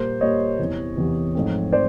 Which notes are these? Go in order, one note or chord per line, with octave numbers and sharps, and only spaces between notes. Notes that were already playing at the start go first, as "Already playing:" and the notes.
Already playing: A#2 G3 A#3 C5
A#2 G3 A#3 C#5 D#5
E2 C3 E3
E2 C3 E3
G#2 F3 A3 C4
F3 A3 C4 C5 D5